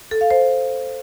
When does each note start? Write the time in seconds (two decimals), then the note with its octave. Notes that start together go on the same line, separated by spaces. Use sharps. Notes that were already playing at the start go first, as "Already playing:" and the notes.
0.11 A4
0.21 F5
0.31 C5